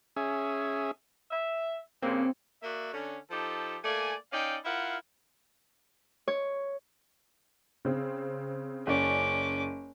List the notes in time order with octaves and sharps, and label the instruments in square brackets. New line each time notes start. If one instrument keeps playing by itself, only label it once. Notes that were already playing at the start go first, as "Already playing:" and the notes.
[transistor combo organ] C#4 G#4 E5
[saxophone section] E5
[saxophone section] G2 C#3 A#3 [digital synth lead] C4
[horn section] A#3 F#4 D5 E5
D3 C#4
F3 D#4 G4 A4
A3 A#3 D5 G#5
C#4 D#4 D5 F5 G5
E4 F4 A#4 F5 F#5
[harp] C#5
[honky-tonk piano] C#3 C4
[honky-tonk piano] F#1 D5 [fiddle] C#4 D6